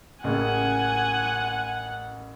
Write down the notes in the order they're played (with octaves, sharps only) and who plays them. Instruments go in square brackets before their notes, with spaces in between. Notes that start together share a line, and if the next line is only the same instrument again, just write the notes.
[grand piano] A1 C#3 A#3 [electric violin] F#5 [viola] G#5